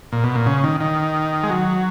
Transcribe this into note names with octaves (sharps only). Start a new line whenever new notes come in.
A#2
B2
A#2
C#3
D#3
D#3
G#3
F#3